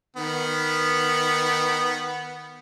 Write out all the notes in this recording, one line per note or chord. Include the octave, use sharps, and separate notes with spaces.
D#3 B3